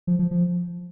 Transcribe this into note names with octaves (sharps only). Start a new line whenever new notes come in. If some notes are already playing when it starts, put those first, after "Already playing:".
F3
F3
F3